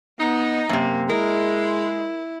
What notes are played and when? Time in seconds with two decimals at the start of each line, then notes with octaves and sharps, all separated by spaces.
0.19 B3 D#4
0.69 F#2 C3 A#3
1.09 G#3 E4 A#4